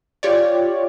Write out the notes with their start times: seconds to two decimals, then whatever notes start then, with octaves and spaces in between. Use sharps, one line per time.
0.23 F4 G4 C#5 D5